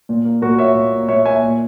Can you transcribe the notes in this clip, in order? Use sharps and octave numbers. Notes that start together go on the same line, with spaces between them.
A#2
A#3
A#2 F#4 A#4
A#3 C#5 E5
A#2
A#3
A#2 C#5 E5
A#3 E5 G#5
A#2